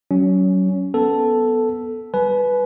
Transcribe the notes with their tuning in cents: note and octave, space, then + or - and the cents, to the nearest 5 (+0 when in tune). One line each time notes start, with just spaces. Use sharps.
F#3 +25 C#4 +15
B3 +0 A4 +0
G3 +0 B4 +0 G#5 +40